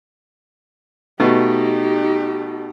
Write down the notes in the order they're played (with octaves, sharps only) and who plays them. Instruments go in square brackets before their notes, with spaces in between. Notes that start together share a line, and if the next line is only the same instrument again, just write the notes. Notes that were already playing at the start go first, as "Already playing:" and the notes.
[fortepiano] B2 A3 [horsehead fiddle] D#4 G4